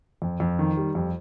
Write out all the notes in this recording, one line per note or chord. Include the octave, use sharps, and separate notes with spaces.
F2
F2
D#3
G3
F2